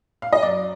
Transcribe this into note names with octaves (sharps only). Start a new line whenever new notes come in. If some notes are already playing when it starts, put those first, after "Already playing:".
F5
D#5
F#2 D5